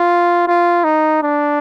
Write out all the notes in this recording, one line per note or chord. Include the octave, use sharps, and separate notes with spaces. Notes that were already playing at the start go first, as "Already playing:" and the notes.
Already playing: F4
F4
D#4
D4